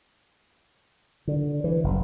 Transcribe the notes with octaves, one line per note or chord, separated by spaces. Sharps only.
D3
E3
F#1